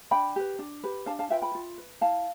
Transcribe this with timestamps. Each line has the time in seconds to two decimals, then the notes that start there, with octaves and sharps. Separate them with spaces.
0.11 D4 G5 B5
0.36 G4 B4
0.59 D4
0.83 G4 B4
1.06 D4 F5 A5
1.19 F5 A5
1.30 F4 B4 E5 G5
1.42 G5 B5
1.55 F4
1.78 B4
2.01 E4 F5 A5